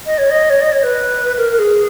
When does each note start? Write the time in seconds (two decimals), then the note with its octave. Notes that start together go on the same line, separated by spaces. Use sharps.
0.06 D#5
0.18 C#5
0.30 D#5
0.50 C#5
0.61 D#5
0.72 C#5
0.83 B4
1.38 A#4
1.52 A#4
1.59 G#4